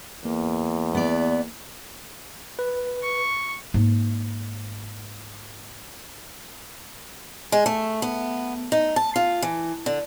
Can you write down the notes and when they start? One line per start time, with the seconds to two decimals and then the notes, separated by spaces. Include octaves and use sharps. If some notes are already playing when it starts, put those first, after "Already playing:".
0.25 E2 A#3
0.95 B3 D5
2.59 B4
3.02 C#6
3.74 G#2 A#3
7.52 G#3
7.66 A3
8.02 B3
8.72 D#4
8.96 A5
9.16 F4
9.42 E3
9.86 D3